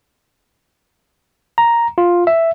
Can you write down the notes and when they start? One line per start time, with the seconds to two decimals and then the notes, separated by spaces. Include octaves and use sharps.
1.58 A#5
1.98 F4
2.27 E5